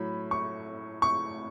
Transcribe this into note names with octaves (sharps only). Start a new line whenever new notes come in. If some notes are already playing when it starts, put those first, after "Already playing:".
Already playing: A2 F#3 B5
C#6
C#6